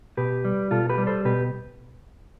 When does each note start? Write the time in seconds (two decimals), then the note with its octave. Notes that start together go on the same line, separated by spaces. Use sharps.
0.17 B2 G4 B4
0.45 G3
0.71 B2 F4 A4
0.89 G4 B4
0.98 G3
1.07 A4 C5
1.25 B2 G4 B4